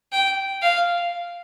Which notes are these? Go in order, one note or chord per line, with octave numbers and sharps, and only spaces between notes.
G5
F5